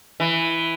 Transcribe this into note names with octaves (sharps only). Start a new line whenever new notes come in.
E3